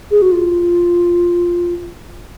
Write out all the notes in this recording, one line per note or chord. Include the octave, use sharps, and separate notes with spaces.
G#4
F#4
F4